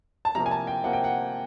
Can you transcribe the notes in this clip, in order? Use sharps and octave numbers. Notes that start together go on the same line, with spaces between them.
A5
C3 F3 A#3 A#5
G#5
A5
G5
C3 F3 A#3 F#5
G5
F#5